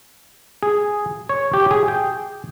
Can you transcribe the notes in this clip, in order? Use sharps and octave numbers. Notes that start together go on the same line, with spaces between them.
G#4
C#5
G4
G#4
G5